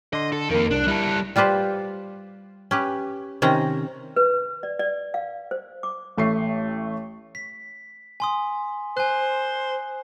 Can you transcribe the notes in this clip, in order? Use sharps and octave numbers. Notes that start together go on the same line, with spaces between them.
D3 D#5 C6
A4
F2 D#3 A#3 A#4
C2 D4 F#6
G3 E4 A4
G3 F4 G4 B4 C5
C#4 G4 B4
C3 D#3 C4 C#4 A#5
B4
D5
D5
F5
C5
D6
A1 A3 C#6 C7
B6
G#5 C6 D#6
C5 G#5 F#6